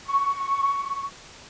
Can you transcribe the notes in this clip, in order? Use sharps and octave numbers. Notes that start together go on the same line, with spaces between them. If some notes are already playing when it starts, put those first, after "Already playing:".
C#6